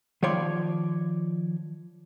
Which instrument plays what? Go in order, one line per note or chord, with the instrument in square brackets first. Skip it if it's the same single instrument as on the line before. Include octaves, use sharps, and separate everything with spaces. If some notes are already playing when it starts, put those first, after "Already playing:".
[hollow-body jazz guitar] D#3 F3 C#5 D5 C6